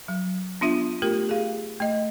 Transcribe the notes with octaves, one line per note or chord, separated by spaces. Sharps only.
F#3
B3 D4 F4 E5
A3 F4 G4 A#4
G#4 F5
A3 D#5